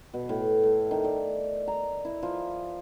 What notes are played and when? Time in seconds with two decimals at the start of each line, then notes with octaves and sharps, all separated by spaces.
0.14 B2
0.29 A2
0.63 A3
0.91 D#3
1.04 D5
1.68 A#5
2.05 E4
2.23 F3